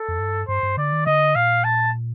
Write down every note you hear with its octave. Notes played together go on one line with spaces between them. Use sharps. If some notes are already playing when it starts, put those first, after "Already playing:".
Already playing: A4
F2
G2
G2 C5
G2
D3 D5
D#3
D3 D#5
A#2 F5
A5